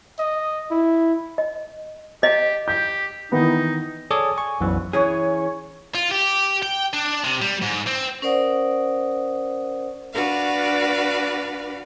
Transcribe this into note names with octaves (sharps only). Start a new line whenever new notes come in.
D#5
E4
D#5
G4 D#5
G4 G6
D#3 E3 B3 D#4
G#4 A4 C#5 D5 D6 D#6
G#5 C#6
B1 F#2 B2 E3
E3 C#4 G#4 C#5
F4
G4
G5
D4
C3
G3
G#2
C4
C#4 A#4 C5 D5 F#5 D#6
D4 F#4 B4 D5 F5